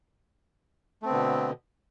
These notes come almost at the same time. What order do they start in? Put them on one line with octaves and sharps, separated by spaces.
A3 C4 B3 D3 B2